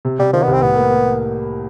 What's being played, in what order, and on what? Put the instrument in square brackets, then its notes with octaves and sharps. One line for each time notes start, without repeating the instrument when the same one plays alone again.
[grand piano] C3
[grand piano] C3 [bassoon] G3
[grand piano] D#3 [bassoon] F3
[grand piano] C2 [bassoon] B3
[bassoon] C4
[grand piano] A2 [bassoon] B3
[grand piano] A#3
A#3